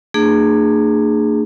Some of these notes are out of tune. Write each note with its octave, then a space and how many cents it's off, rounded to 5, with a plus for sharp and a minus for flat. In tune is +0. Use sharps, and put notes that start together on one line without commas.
A#3 -45 D4 +35 G#4 +0